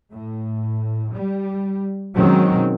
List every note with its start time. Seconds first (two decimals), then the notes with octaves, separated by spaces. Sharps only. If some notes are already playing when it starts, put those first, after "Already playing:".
0.10 A2
1.12 G3
2.15 B2 D#3 F#3 G#3 C4 C#4